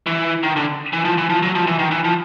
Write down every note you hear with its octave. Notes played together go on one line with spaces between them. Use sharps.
E3
D#3
D3
E3
F3
E3
F3
F#3
F3
E3
D#3
E3
F3